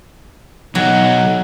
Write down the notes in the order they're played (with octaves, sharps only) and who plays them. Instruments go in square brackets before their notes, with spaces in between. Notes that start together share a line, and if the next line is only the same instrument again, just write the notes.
[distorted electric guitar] B1 [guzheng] F#3 [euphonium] D#4